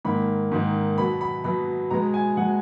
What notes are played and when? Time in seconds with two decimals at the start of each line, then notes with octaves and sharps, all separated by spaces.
0.05 G#2 D#3 A#3 B5
0.52 G#2 D#3 A#3
0.97 B2 F#3 B3 B5
1.21 B5
1.44 B2 F#3 B3 B5
1.91 B2 G#3 B3 A#5
2.14 G#5
2.37 B2 G#3 B3 F#5